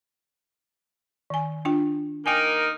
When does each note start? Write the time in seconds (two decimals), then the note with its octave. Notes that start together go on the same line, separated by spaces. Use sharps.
1.30 D#3 G#5
1.65 D4 F4 G5
2.26 A#3 D#4 A#4 G5 G#5